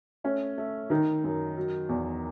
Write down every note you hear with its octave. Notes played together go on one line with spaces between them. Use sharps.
A3 C#4
A3
D#3 D#4
F#2
F#3
E2